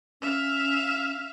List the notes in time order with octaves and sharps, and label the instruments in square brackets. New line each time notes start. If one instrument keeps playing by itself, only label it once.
[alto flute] C#4 [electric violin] E5 F5